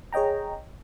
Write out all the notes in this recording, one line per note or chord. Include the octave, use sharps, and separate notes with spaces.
G#4 C#5 D#5 G5 A#5